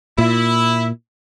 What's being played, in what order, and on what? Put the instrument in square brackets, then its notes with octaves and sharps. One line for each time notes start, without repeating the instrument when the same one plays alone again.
[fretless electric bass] A#2 [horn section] E4